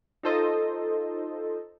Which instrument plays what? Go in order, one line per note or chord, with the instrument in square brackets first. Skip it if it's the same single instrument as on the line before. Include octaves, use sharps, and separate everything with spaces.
[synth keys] D#4 F4 A4 C5 D#5